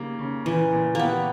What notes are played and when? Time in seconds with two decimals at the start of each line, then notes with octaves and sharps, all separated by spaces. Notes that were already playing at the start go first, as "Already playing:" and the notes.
Already playing: C#3 G3 A#3 D#4
0.19 C#3
0.45 A#2 E3
0.72 A#2
0.95 A#3 B3 G4